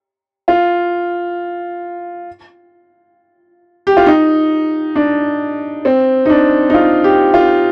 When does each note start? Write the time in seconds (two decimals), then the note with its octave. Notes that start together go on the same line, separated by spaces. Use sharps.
0.48 F4
3.87 G4
3.97 F4
4.06 D#4
4.96 D4
5.85 C4
6.26 D#4
6.30 D4
6.70 D#4
6.74 F4
7.04 G4
7.34 F4